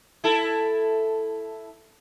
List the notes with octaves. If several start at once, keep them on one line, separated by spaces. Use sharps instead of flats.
E4 A4